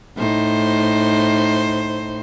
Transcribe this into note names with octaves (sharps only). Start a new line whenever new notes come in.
A2 D#4 C5